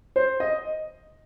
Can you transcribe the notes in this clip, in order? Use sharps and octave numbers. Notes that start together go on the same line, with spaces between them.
C5
D#5